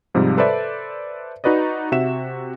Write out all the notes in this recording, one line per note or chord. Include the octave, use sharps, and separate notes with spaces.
G#2 C3 F3 G3
A4 B4 C5 D5 E5
D#4 F#4 B4 D5 D#5
C3 F#4 E5 F#5 E7